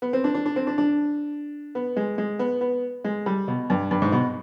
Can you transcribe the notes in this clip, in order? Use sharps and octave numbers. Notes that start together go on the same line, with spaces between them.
B3
C4
D4
D4
D4
C4
D4
D4
B3
G#3
G#3
B3
B3
G#3
G3
B2
G2
G2
G#2
B2